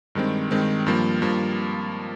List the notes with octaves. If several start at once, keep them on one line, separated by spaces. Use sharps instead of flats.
G2 D#3 G#3 C4
G2 D#3 G#3 C4
G2 F3 A#3
G2 F3 A#3